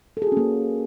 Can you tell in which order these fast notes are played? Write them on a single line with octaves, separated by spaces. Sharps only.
A4 G#4 F#4 C#4 A#3